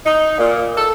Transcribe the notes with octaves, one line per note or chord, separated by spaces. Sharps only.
D#4
A#2
A4